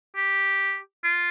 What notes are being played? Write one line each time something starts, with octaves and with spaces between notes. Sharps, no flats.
G4
F4